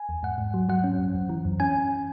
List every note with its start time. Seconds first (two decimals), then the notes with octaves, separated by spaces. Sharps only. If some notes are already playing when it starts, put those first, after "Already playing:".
Already playing: G#5
0.09 E2
0.23 G#2 F#5
0.38 G#2
0.54 F#3
0.69 F#3 F#5
0.84 C#4
0.99 F#2
1.14 F#2
1.29 E3
1.45 F#2
1.60 C#4 G#5